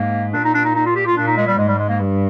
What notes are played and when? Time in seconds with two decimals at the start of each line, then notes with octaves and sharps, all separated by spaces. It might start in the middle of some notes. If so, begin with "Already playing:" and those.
Already playing: G#2 A#3
0.33 A#2 D4
0.44 D#4
0.54 D4
0.64 D#4
0.75 D#4
0.86 F4
0.95 G4
1.06 F4
1.17 A#2 D4
1.27 D#4
1.37 G#3
1.47 G3
1.58 G#2 G#3
1.68 G3
1.79 G#3
1.89 A#3
1.99 G2